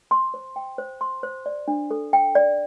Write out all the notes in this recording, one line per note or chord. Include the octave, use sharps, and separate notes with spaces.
C6
C5
G5
C5
C6
C5
D5
D4
A4
G5
D5